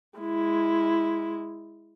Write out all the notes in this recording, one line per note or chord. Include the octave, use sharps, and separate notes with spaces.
G#3 E4